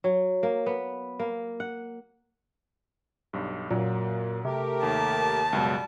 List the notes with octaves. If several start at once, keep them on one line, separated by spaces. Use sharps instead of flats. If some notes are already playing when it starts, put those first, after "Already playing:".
F#3
A#3
B3
A#3
F#5
B1 G2
F#2 A#2 F#3 A#3
C3 A3 G4 A#4
D#2 A5
C#2 F#2 B2 G3